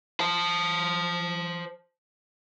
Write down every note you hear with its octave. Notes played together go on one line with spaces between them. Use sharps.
C5 A5